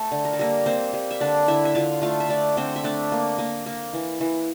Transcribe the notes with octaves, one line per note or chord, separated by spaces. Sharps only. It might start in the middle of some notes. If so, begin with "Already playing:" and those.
Already playing: A3 A4
D3
A#4
A4
G3 A#3 A#4
A#3 C4 C5
G3
E5
D3 D4 D5
D3 E4 E5
E5
D3 F4 F5
A3 F4 F5
E5
A3 D4 D5
D3 C4 C5
E5
A3 D4 D5
A#3
A#3
A#3
E3
E3